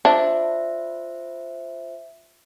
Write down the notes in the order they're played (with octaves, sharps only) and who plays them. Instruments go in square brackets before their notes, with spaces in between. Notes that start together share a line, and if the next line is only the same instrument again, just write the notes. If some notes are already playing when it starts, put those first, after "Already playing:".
[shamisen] D4 [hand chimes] F4 C5 E5